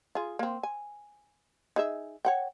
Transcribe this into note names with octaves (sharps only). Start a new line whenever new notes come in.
F4 G#4
A#3 C4
G#5
D#4 G#4 E5
C#5 F#5 G5